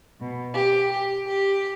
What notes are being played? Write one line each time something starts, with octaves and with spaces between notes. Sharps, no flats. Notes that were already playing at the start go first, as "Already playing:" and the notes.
B2
G4
G4
G4